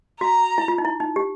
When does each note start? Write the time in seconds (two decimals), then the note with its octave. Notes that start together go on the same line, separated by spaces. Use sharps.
0.21 F#4 A#5
0.58 E4
0.68 F4
0.78 D#4
0.85 E4
1.00 D#4
1.16 G4